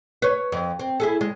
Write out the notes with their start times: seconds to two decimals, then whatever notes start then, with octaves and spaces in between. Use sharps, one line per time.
0.22 B4 C#5
0.52 F2
0.79 C4
1.00 E4 G#4 A4
1.21 G#3